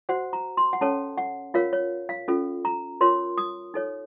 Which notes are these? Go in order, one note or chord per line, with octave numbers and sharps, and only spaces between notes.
F#4 C5 F#5
A#5
C6
F#5
C#4 A4 C#5 A5
F#5
F4 A#4 C#5 F5
C#5
F5
C#4 F4 A4
A#5
F4 A#4 C#5 C6
D#6
D#4 A4 C#5